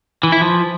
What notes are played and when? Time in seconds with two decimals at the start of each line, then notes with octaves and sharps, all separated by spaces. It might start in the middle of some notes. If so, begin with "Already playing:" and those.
0.23 E3
0.32 E4
0.41 F3